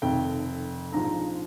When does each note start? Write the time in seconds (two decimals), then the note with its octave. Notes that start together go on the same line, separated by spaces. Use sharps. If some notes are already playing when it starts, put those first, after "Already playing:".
0.02 F1 F2 D#3 G5
0.92 A#1 G#2 F3 A#5